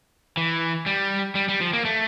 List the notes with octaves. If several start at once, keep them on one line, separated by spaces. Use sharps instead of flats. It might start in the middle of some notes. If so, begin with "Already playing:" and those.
E3
G3
G3
G3
F3
A#3
A3